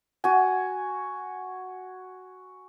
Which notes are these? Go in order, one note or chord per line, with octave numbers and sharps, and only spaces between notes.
F#4 G#5